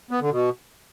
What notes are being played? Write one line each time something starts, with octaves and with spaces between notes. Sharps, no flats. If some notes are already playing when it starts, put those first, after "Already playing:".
B3
D3
B2